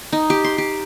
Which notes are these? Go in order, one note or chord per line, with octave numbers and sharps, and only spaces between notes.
D#4
G4
C6
G4